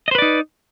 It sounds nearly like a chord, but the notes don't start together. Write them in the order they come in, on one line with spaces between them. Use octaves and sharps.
D#5 C5 B4 D5 D#4